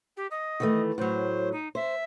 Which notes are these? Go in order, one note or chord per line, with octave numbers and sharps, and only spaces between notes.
G4
D#5
D#3 E3 A3
A2 F#3 C5
D#4
C5 E5